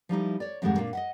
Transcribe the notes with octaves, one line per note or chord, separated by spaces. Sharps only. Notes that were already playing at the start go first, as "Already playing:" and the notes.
F3 G3 D#4 E4
C#5 D5
F2 G#2 D#3 G3 G#3 F#5
A#2 D4
D#5 E5 F#5